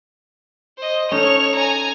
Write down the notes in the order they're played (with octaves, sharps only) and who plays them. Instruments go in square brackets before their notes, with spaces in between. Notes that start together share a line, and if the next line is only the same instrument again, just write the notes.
[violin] C5 D#5
[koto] C#4 D#4 A4 [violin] C#5 F7
[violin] G#5 A#5